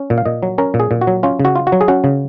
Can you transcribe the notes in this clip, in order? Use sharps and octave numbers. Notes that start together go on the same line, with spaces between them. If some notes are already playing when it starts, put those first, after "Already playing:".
Already playing: C#4
A#2
F5
A#2 D#5
F#3
C#4 A#4
A#2
G#4
A#2
F#4
F#3
C#4 F4
C#3
F#4
F4
F#4
F#3
G#4
C#4 F#4
C#3